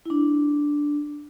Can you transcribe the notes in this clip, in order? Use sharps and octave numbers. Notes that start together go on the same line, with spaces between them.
E4
D4